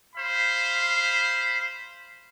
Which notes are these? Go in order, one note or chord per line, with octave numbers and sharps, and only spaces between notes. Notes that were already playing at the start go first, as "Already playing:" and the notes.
C5 F5 B5